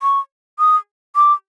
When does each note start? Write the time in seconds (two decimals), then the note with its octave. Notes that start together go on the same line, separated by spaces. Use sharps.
0.02 C#6
0.59 D#6
1.16 D6